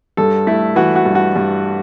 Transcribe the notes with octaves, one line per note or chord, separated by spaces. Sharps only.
G2 A4
A3 E4
E3 F#4
F#4
G2
F#4
G2